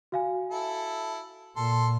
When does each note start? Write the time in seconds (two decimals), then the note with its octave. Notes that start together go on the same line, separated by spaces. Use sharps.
0.12 F#4 F5 G#5
0.51 E4 A4
1.56 A#2 A4 C6